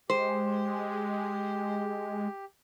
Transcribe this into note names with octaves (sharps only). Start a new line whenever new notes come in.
G#3 G4 C5